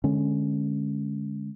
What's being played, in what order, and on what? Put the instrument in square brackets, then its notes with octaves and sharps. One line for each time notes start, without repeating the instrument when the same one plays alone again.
[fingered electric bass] D3 G#3 C#4